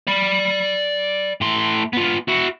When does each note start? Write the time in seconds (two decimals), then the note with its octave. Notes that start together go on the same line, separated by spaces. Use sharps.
0.07 D5 B5
1.41 A2 C6
1.93 B3 F4
2.28 E4 F#4